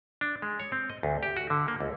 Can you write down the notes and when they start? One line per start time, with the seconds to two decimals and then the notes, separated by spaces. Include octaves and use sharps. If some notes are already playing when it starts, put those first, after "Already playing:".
0.21 D4
0.42 G#3
0.60 C#5
0.72 C4
0.90 D#5
1.03 D2
1.23 G4
1.37 F#4
1.50 D3
1.68 A#3
1.80 C#2